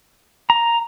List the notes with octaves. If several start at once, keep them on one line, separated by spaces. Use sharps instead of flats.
A#5